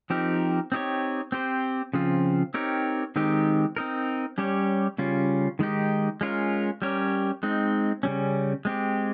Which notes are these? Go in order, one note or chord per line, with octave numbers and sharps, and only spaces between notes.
F3 C4 D#4 G4 A#4
C4 D#4 G4 C#5
C4 G4 C5
C#3 F3 C4 F4
C4 D#4 G4 A#4 C#5
D#3 G#3 C4 D#4 G4
C4 D#4 A#4
G3 C#4 G4 C#5
C#3 G3 C#4 F4
D#3 G#3 D#4 G4
G#3 C#4 F4 A#4
G3 C#4 G4 A#4 C#5
G#3 C4 D#4
C#3 G3 C#4
G#3 C4 G4